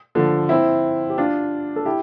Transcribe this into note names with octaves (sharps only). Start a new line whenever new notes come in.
D3 F3
C4 E4
G4
D4 F4
A4
E4 G4